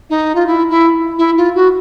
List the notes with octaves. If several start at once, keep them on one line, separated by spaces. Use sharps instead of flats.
D#4
F4
E4
E4
E4
F4
F#4